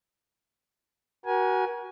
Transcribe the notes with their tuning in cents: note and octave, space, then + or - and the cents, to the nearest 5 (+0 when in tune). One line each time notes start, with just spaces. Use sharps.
F#4 +20 A#4 +40 G#5 +0